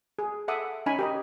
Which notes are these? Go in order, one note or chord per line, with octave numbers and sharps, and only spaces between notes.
G#4
A4 E5 F#5 D6 D#6
C#4 D#4 G#5 B5
G4 A#4 D#5